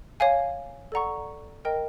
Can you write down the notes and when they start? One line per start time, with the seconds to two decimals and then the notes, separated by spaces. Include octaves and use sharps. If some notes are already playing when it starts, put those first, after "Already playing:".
0.20 C#5 F5 G#5
0.92 A4 D5 F#5 A#5 C#6
1.65 A#4 D#5 G5 A#5